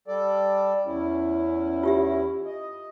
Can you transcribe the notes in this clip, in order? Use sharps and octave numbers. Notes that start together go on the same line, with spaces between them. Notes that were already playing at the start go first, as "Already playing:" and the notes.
G3 A4 D5
E2 C#4 E4
F4 G4 E5
D#5